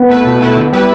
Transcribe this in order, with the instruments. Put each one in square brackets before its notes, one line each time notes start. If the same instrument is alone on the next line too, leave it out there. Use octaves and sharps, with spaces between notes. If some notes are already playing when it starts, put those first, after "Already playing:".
Already playing: [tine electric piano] B3
[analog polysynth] A3 E4 B4
B2
A3 E4 B4
D3
G3 E4 B4